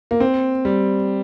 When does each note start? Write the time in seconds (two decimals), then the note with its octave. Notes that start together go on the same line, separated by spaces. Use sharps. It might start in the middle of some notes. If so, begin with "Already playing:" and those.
0.11 A#3
0.20 C4
0.65 G3